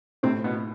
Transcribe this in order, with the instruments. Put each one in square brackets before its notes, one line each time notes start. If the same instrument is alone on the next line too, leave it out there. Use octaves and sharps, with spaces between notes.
[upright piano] A2 [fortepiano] C3 C4
[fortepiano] B2 B3